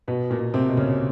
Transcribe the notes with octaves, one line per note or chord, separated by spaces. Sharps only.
B2 B3
A#2 A#3
B2
C3 C4
B2
C#3 C#4